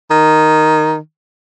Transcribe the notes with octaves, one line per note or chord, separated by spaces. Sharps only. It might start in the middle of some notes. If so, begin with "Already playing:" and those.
D#3